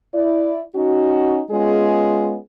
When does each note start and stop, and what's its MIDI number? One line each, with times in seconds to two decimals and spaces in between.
0.14 0.62 64
0.14 0.62 74
0.75 1.42 61
0.75 1.42 63
0.75 1.42 66
1.51 2.37 56
1.51 2.37 59
1.51 2.37 61
1.51 2.37 65
1.51 2.37 68